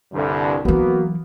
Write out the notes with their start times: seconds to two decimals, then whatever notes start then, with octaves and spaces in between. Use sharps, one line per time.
0.13 C2 G2 D3
0.65 E3 F#3 A#3 B3 F#4